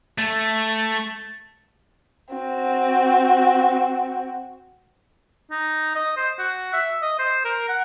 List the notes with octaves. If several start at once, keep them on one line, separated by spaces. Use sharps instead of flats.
A3 A6
C4 F#4
D#4
D#5
C5
F#4
E5
D#5
C5
A#4
F#5